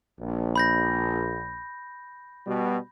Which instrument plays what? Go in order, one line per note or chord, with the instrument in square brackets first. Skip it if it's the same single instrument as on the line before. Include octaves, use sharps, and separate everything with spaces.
[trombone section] A#1
[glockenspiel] B5 G6 A#6
[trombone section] B2 G3